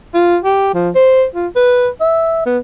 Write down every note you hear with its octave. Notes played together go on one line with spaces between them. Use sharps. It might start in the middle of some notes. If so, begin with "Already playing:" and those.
F4
G4
F3
C5
F4
B4
E5
B3